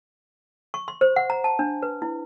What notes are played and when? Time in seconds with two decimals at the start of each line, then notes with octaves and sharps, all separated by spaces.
0.74 C#6
0.88 C6
1.01 C5
1.16 F#5
1.30 A#5
1.44 A5
1.59 D4
1.83 B4
2.02 E4